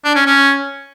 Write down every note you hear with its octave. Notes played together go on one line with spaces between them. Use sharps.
D4
C#4
C#4